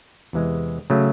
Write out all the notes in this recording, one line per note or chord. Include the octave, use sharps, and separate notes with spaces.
E2 C3 E3 G#3
C#3 F#3 A3